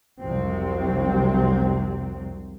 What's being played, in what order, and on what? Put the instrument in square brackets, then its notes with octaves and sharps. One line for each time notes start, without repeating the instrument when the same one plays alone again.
[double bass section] F1 C2 C3 F3 F#3 C4